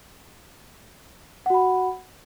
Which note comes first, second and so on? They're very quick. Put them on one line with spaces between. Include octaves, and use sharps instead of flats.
F#5 F#4 B5